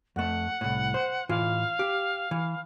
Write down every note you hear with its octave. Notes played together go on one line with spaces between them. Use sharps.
F2 A3 F#5
C2 A2
C5
A2 E3 F4 F5
G4
E3